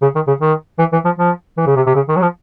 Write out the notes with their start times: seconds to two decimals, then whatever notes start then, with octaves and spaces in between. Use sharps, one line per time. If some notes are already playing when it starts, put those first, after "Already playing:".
0.02 C#3
0.15 D#3
0.27 C#3
0.41 D#3
0.79 E3
0.93 E3
1.05 F3
1.18 F3
1.57 E3
1.67 C#3
1.76 C3
1.86 C3
1.95 C#3
2.08 D#3
2.16 F#3
2.21 F3